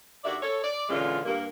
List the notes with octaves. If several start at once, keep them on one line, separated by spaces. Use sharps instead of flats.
D#2 D4 F#4 D5 E5
A4 C#5
D5
A#2 D3 E3 G#3 C#4 F4
G2 A#3